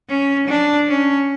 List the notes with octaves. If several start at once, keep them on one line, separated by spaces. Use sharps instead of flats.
C#4
D4
C#4